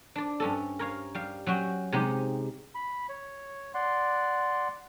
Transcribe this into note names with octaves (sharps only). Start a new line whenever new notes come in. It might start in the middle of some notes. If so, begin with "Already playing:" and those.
D4 D5
G2 C#4 A4
A#4 C#5 F5
G3 F5
F#3 C#4 F#4 G5
C3 G#3 D#4 G4
B5
C#5
D5 F#5 C6